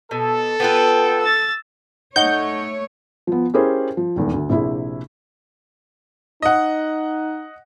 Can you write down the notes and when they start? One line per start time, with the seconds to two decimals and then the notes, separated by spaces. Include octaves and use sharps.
0.11 B2 A4
0.60 B3 F4 B4 G5
1.21 E6 A6
2.16 A3 D#4 C#5 D#5 F#5 G6
3.27 F3 B3
3.54 C#4 E4 G4 G#4 A#4 C5
3.97 F3
4.16 D#1 E2 G#2
4.34 D2
4.49 A#1 C3 E4 G#4
6.42 D#4 D#5 F#5